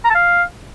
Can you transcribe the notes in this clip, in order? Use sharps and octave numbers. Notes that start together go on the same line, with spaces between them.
A#5
A5
F5